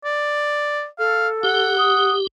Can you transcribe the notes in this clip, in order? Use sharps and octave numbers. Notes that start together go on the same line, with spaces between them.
D5
A4 F5
G4 F#5
D#6